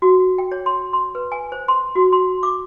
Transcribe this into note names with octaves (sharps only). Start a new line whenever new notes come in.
F#4
G5
C#5
C6
C6
B4
G#5
C5
C6
F#4
C6
D6